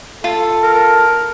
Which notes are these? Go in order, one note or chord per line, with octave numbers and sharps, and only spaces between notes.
F4 A4
A#4